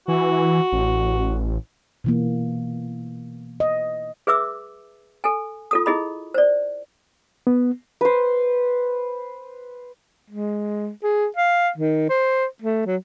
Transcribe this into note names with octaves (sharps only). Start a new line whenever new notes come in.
E3 F#4
A1
B2 E3 A#3
D#5
G#4 B4 E5 D6 E6
A4 G#5
F4 A4 D#6
E4 G#4 D#5 B5
C5 D5
B3
B4 C5
G#3
G#4
F5
D#3
C5
A3
F#3